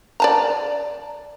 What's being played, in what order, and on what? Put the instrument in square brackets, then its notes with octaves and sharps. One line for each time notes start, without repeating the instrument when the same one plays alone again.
[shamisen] D5 A5 A#5